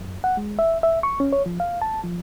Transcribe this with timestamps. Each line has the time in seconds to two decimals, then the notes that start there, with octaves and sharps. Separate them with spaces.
0.01 F#2
0.24 F#5
0.37 G#3
0.59 E5
0.83 E5
1.03 C#6
1.20 C#4
1.33 C#5
1.46 F3
1.60 F5
1.82 A5
2.04 F3